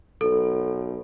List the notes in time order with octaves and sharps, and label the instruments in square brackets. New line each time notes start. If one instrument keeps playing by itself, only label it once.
[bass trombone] B1 [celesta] A4